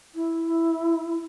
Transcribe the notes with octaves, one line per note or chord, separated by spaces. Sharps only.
E4